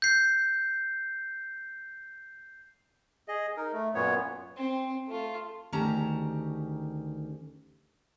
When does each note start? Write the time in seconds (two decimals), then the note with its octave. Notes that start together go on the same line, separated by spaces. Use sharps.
0.02 G6 C7
3.28 G#4 D#5
3.57 D#4 A#4
3.73 A3
3.95 F#2 A#2 B3 C#5
4.57 C4
5.08 A3 F4
5.72 D2 D#3 C#4 G4 A5 A#5